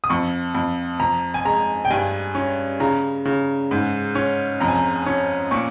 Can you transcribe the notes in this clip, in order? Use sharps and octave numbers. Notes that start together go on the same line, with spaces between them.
D#6
F2 C#6
F2
F2 A#5
G#5
G#3 A#5
G5
G2 G#5
C#4
C#3 A#5
C#3
G#2
C#4
F2 A#5
G#5
A#5
C#4
A#2 C#6